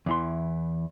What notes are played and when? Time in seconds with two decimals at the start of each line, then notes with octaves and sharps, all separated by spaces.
0.06 E2 E3 C6